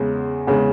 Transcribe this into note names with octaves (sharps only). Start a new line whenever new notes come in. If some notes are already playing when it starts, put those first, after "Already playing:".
Already playing: E2 C#3 G#3
E2 C#3 G#3